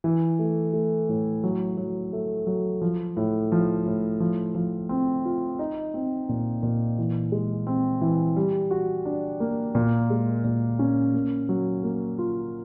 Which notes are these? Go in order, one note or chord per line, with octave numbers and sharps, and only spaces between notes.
E3
A3
A3
A2
F#3
F#3
A3
F#3
F3
A2
F3
A2
F3
F3
C4
F4
D#4
C4
A#2
A#2
E3
G#3
C4
E3
G3
F#4
D4
A#3
A#2
G#3
A#2
C#4
A#3
F#3
A#3
F4